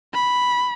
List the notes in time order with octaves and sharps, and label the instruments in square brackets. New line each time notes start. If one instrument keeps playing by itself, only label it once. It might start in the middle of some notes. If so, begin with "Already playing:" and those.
[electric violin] B5